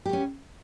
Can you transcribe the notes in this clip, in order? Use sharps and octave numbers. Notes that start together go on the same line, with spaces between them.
B3 C#4 G4